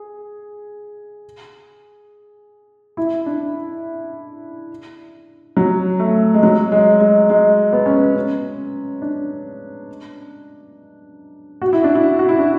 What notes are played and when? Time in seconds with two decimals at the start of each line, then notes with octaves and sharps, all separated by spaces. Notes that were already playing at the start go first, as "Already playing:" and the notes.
Already playing: G#4
2.97 E4
3.26 D4
5.57 F#3
5.99 A3
6.34 G#3
6.43 F#3
6.72 G#3
7.01 G#3
7.30 G#3
7.73 B3
7.86 C#4
7.97 B3
8.16 C#4
9.02 D4
11.62 F#4
11.73 E4
11.84 D4
11.95 E4
12.19 F#4
12.29 E4
12.39 D4